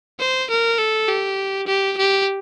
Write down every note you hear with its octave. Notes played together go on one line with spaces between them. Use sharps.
C5
A#4
A4
G4
G4
G4